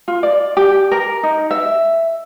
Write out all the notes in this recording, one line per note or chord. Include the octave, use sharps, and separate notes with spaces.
F4
D5
G4
A#4
D#4
E5